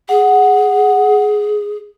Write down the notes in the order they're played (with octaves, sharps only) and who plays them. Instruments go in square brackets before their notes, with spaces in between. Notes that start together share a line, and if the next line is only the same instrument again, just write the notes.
[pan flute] G#4 [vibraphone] F#5